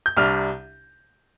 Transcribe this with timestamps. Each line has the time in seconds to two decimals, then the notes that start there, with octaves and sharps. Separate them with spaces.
0.06 G6
0.17 C2 C3 G3 D4 F6